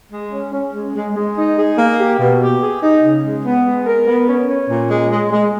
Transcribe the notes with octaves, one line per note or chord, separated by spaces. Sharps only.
G#3
C#4
C#4
G#3
G#3
G#3
D#4
G#4
A#3
G4
B2
G4
G#4
D#4
C#3
G#3
B3
G#3
A#4
B3
C#4
C#4
A#2
G#3
G#3
G#3